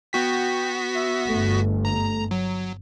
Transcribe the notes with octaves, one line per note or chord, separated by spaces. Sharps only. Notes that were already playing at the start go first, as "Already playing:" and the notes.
B3 F#4 G5 B6
E5
G1 A3
A#5
F#3